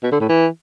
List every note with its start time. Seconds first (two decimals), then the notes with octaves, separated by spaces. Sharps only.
0.03 B2
0.12 D3
0.20 A2
0.29 E3